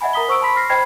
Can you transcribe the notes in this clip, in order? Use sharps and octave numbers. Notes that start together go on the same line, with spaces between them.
D#5 E5 F#5 G#5 B5
A#4 A#5 D#6 B6 G7
C5 C#6 E6 D7
A5 B5 C6 B6
F6 A#6 C7
C5 D#5 G5 B5 G#6 C7